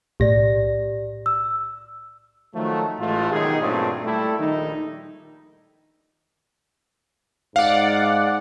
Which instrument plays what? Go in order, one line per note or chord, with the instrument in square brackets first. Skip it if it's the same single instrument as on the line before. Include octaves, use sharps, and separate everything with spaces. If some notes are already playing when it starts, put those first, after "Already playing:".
[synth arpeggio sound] B1 A2 A#6 [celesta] G4 D5
[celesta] E6
[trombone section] D#3 F3 F#3 A3
A1 A2 E3 G#3 A3 F4
B1 D#3 D#4 G4 G#4
G2 A#2 F#3 A3 C4
G3 A3 E4 G4 A4
A#1 D#3 G3 D#4
[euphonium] G#2 [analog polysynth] D5 F#5 [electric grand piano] F5